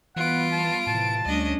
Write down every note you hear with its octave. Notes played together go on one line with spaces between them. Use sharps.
E3 G3 B3 F4 B4 F#5 D7
A5
A2 C3 E3 A5
D2 G3 A3 C#4 D4 D#5